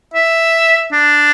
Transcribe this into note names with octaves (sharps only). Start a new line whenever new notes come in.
E5
D4